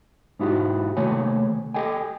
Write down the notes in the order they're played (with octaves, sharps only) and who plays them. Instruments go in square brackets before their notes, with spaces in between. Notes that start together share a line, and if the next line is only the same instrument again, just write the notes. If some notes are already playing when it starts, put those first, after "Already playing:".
[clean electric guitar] G#2 D#4 E4 F#4 G4
D#2 C3 A3 C#5 G#5
G4 A4 D#5 G5 G#5